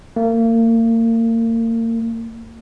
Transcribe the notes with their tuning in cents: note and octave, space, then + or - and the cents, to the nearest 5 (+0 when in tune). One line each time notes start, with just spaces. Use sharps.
A#3 -35